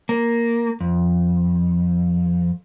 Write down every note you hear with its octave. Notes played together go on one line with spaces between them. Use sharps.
A#3
F2